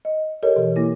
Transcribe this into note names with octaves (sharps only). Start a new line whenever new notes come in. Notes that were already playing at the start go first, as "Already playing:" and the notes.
D#5
G4 A4 A#4 C#5 D#5
B2 E3
A#3 E4